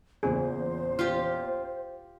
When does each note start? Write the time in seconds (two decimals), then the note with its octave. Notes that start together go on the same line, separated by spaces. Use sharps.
0.23 E2 A#2 C#3 G#4 C5
0.99 F4 G4